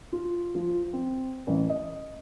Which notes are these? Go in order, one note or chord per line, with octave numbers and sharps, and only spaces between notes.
F4
F3
C4
A1
D#5